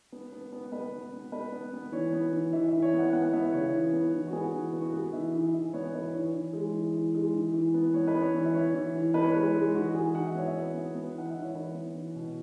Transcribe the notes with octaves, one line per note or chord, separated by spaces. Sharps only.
B3
B3
B3
B3 B4
B3
B3
B3 B4
B3
B3
E3 C#5
B3
E3
E3 E5
E3 E5
C#5
B3
F#5
B3 F#5
B3 E5
C#3 C#5
E3
B3
E3
F#4
B3 G#4
E3
B3
F#4
B3 G#4
E3 E5
E3
E3 E5
B3 C#5
E3 B4
E3 C#5
E3
G#3
E3
E3
G#3
E3
E3
B3
B3 C#5
B4
B3
C#5
E3
E5
B3 C#5
E3
E3
B3 B4
C#5
G#3 B4
G#3
E3 F#4
E3 G#4
E3 F#5
E5
B3 C#5
E5
B3
B3
B3
E3 F#5
E5
E3
C#5
E3 B4
B3
E3
B2